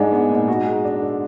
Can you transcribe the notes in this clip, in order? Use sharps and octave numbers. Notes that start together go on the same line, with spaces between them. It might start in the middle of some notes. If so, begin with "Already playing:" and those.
Already playing: G#2 G#3 D4
B3
A#2
F#4
G#3
D4
D3